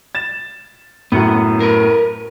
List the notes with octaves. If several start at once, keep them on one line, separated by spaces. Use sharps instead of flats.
A6 E7
F#2 A2 B3
A#4 B4